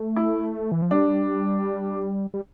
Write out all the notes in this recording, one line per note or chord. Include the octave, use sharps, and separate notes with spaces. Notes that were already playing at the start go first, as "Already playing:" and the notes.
Already playing: A3
E4
E3
F3
G3 D4
G3